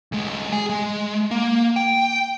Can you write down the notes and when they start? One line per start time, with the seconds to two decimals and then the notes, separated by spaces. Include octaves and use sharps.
0.12 D2 G#3
0.52 G#4 G#5
0.69 G#3
1.31 A#3
1.76 G5